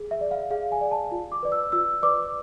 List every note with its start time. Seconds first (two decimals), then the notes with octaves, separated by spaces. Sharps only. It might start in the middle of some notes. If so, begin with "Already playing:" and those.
Already playing: G#4
0.11 E5
0.21 D5
0.31 F5
0.50 G#4 F5
0.72 G#5
0.81 D5
0.91 A5
1.12 F4
1.32 D6
1.43 B4 D5
1.52 E6
1.72 F4 E6
2.02 B4 D5 D6